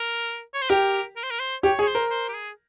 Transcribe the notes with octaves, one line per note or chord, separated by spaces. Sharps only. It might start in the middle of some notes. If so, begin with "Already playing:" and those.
Already playing: A#4
C#5
C5
G4 A#4
A#4
C5
A#4
C5
G4 C#5
G#4 C#5
C5
A#4
C5
G4
G#4